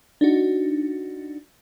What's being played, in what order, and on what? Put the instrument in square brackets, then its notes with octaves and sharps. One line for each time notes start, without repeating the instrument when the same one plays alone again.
[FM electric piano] D4 D#4 F#4